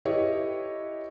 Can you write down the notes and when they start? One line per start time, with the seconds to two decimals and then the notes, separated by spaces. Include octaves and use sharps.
0.05 E4 G4 A4 B4 C#5 D#5